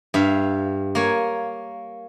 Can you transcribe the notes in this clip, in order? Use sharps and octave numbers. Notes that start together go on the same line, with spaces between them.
G2 E5 F5
A#3 C#5 G#5